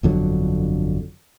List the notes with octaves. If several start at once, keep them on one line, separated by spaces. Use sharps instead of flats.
G1 F2 D3 F#3